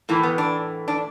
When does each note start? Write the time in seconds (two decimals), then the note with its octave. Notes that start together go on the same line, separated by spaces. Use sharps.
0.09 A2 E3 A#3
0.23 B3
0.38 D4
0.88 D4